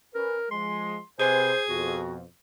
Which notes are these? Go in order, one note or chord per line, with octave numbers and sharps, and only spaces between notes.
C#4 A#4 B4
F3 G#3 C6
C3 G#4 B4 C5 G#5
F2 B2 F#4